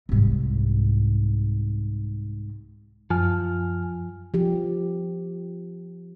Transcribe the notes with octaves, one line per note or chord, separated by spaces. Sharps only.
C2 G#2
F#2 F3 G#5 F6
F3 G4